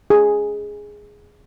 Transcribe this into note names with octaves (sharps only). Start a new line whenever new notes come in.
G#4